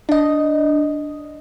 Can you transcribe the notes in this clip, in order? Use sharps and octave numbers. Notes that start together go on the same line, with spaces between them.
D4 D#5